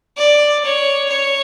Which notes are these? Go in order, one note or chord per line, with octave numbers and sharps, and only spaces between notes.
D5
C#5
C#5